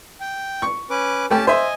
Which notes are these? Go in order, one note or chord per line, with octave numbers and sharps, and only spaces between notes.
G5
C#6
C#4 B4 D6
A3 C#4 G4 G5 A5
C5 D#5 E5 G#5